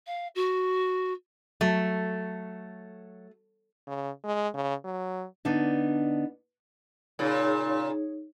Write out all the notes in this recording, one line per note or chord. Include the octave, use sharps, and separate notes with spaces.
F5
F#4
F#3 A3
C#3
G#3
C#3
F#3
D3 B3 D4 D#4
A#2 C#3 D#4 G#4 C#5